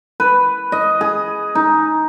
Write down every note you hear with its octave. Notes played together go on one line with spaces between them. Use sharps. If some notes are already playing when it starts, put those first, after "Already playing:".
B4
D#5
G#4
D#4